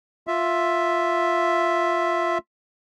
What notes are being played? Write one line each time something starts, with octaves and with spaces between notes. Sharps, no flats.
F4 E5